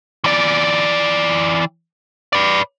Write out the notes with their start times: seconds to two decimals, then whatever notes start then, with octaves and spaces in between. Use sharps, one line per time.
0.24 E3 D5
2.33 B4 D5